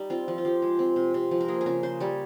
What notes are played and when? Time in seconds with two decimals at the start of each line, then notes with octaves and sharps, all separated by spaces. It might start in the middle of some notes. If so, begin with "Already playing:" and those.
Already playing: G3 D#4
0.10 C4 F4
0.28 F3
0.38 F4
0.45 F3 G4
0.62 G#3
0.79 C4
0.96 C3
1.14 C3
1.31 F3
1.41 A#4
1.48 A#3 G#4
1.61 G#4
1.66 C#3 A#4
1.83 C#3 C5
2.00 G3 C#5